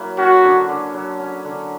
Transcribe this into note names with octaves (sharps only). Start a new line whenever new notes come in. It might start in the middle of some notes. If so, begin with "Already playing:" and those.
Already playing: F#3 A#3 E4
C#4 F#4
D3
D3
F#3
C#4
D3